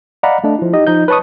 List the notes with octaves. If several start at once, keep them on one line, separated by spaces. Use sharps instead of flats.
D5 D#5 F5 F#5 A#5 B5
A3 D4 D#5
F3 E4
D#4 G4 D#5
F3 D#4 D#5 G6
B4 C#5 A5 C#6 D#6